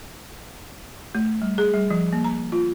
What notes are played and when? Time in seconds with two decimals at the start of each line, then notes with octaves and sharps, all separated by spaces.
1.15 A3
1.42 G3
1.58 G#4
1.74 G3
1.91 F3
2.13 A#3
2.24 A#5
2.52 F4